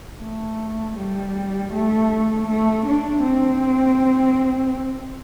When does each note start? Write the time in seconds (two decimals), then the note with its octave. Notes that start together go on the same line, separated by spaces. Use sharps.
0.22 A3
0.98 G3
1.73 A3
2.48 A3
2.86 D4
3.23 C4